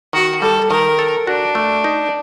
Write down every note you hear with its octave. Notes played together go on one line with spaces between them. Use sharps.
D#3 F#4
G3 A4
D#3 A#4
A4
D4 F#4
A3
D#4